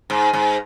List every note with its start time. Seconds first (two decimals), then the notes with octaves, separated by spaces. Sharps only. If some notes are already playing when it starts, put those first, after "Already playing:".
0.10 G#2
0.33 G#2